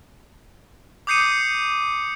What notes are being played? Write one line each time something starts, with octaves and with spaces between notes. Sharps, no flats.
D6 D#6 G6 C7 C#7 D#7